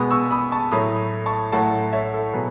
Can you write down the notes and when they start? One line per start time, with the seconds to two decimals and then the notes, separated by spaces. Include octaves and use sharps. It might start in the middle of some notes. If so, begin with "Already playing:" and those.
Already playing: B2 G#3 B3 B5 D#6
0.11 C#6 E6
0.31 B5 D#6
0.52 A5 C#6
0.72 A2 F#3 A3 B5 D#6
1.26 A5 C#6
1.52 A2 F#3 A3 F#5 A5
1.92 C#5 E5
2.14 A4
2.33 B2 F#3 G#4 B4